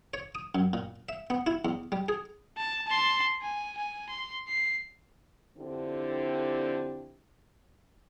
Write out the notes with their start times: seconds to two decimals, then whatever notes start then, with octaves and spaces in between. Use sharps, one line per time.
0.14 C#5
0.35 D#6
0.55 F#2
0.73 A#2
1.09 E5
1.30 B3
1.47 E4
1.65 E2
1.92 G3
2.09 G#4
2.57 A5
2.87 A5 C6
3.42 G#5
3.77 G#5
4.10 C6
4.48 C7
5.58 F2 D3 C4 D4 E4 G4